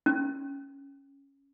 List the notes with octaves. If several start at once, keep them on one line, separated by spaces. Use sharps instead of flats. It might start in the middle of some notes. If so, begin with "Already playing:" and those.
C#4